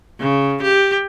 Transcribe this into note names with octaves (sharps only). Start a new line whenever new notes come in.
C#3
G4